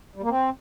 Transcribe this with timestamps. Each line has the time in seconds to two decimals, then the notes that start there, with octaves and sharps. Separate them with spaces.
0.15 G3
0.23 A#3
0.30 C4